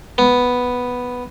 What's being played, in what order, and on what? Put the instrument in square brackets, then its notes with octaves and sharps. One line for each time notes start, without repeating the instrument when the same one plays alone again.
[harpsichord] B3